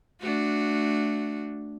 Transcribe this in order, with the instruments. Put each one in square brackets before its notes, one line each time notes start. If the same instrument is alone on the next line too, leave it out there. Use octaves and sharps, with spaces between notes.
[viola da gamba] A3 D4 F#4